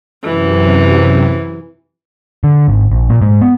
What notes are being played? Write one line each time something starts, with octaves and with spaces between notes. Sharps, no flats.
F#2 C3 E3
D3
G#1
A#1
A#2
G#2
B3